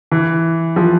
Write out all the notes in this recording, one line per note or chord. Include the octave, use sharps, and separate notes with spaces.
E3
F3